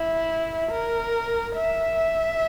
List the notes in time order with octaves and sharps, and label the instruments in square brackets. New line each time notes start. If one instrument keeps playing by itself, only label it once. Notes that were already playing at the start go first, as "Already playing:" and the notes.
Already playing: [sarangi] E4
A#4
E5